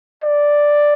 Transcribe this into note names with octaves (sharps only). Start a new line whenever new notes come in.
D5